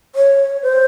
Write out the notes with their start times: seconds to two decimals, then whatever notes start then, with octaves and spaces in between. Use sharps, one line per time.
0.15 C#5
0.62 C5